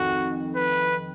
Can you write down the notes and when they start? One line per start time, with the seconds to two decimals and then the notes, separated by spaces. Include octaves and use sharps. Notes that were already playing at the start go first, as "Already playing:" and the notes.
Already playing: F2 D#3 F#4
0.56 B4